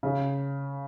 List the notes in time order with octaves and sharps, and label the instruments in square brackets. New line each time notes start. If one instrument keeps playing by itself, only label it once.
[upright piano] C#3